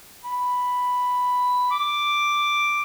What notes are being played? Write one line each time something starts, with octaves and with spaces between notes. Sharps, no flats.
B5
D6